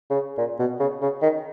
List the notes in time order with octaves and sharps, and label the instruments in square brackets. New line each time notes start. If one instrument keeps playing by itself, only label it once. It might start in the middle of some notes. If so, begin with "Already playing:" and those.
[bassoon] C#3
A#2
B2
C#3
C#3
D#3